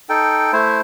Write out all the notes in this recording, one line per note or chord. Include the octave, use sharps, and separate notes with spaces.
D#4 A4 G5
A3 E4 C5